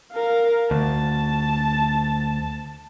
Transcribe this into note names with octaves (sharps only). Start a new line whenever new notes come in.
A#4 F5
D2 A5